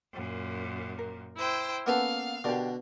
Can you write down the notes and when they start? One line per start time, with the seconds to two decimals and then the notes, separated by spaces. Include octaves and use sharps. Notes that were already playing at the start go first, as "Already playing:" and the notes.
0.13 F#2 A#2
0.99 A#4
1.36 E4 C5 G5
1.86 A#3 B3 C#4 A4 B4 F5 F#5
2.44 B2 D3 G4 A#4 D5